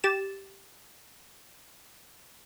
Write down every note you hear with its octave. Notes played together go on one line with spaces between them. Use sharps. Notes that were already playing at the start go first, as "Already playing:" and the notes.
G4 A6 E7